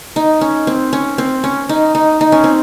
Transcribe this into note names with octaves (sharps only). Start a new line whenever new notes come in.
D#4
C#4
C4
C#4
C4
C#4
D#4
D#4
D#4
C#4
C4